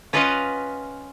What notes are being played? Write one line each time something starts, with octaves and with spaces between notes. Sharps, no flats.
C#4 F4 B4 D#5 F5 F#5